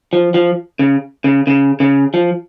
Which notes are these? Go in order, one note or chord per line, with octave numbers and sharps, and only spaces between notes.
F3
F3
C#3
C#3
C#3
C#3
F3